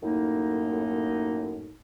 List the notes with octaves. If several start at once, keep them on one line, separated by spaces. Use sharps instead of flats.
F#2 A2 A#3 D#4